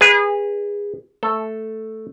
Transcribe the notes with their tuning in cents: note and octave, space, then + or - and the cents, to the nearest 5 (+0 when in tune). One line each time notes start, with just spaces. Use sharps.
G#4 -25 B4 -20
A3 +0 A4 +0